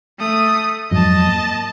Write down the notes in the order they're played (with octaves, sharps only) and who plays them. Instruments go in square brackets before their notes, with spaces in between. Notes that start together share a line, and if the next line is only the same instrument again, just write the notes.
[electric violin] A3 D#6
[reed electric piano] F2 G#2 F#3 [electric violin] D#5 A5
[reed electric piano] A#3